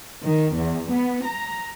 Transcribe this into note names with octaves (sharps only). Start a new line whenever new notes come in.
D#3
E2
B3
A#5